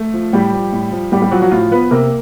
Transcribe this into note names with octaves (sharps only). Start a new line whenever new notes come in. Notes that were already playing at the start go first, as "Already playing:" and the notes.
Already playing: A3
F3
A2 G3 G4
F3
A2
F3
A2 G3 G4
G3 G4
F3 F#3 F#4
F#3 F#4
A2 F3 F4
F3 B3 B4
C3 A#3 A#4